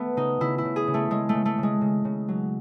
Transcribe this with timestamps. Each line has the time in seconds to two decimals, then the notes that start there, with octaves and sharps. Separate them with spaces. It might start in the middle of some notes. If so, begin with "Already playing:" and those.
Already playing: A3 B3
0.16 C#3 D#4
0.40 C#3 E4
0.58 E4
0.65 C#3
0.76 G#4
0.87 C#3
0.94 A3
1.10 C#3 G#3
1.29 A3
1.34 C#3
1.45 A3
1.58 C#3 G#3
1.81 C#3
2.05 C#3
2.28 F#3